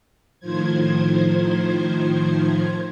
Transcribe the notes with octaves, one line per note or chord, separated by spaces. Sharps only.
A2 D#3 F3 C5 G#6